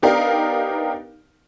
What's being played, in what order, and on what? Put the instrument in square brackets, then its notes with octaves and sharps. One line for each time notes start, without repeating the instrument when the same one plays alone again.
[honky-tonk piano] B3 D4 D#4 G4 A#4 F5